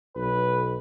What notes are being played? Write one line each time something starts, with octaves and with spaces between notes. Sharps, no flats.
B1 B4